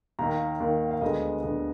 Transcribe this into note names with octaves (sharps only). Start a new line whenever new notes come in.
D#2 D#3 A#3 A#5
D#2 D#3 A#3
F5
D2 D3 G#3 B3 D#5
D2 D3 G#3 B3